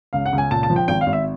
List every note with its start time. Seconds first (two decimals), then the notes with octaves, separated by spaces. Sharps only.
0.13 C#2 F5
0.26 F#5
0.33 C#2
0.38 G#5
0.51 A#2 A5
0.63 A5
0.70 F3
0.76 G5
0.88 G#1 G5
1.01 F5
1.06 G#1
1.13 E5